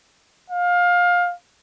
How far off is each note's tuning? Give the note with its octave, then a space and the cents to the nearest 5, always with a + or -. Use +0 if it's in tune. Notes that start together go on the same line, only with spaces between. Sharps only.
F5 +20